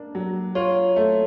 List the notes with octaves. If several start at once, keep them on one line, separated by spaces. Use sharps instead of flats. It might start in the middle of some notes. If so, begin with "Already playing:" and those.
Already playing: A#3 D4
F#3
F4 C#5
A3